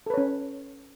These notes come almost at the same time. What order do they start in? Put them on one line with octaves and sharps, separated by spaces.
A4 B4 C#5 C#4